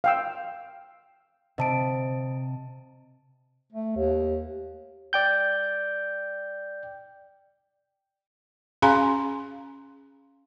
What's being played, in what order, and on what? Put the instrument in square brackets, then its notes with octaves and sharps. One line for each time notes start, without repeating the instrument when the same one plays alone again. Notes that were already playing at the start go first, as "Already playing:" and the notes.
[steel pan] F5 G5 E6
[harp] C3 [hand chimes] D#5 A5 D7
[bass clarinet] A3
D#2
[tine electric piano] D5 G5 G6
[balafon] C#4 G#4 F5 G#5 A#5 C6